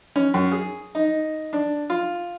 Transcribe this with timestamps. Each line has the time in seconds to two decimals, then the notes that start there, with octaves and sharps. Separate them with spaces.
0.16 C#4
0.34 F#2
0.52 G#4
0.95 D#4
1.53 D4
1.90 F4